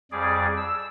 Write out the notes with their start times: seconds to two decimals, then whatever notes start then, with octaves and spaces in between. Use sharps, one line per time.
0.12 F2 G3 G#4 D5
0.57 E6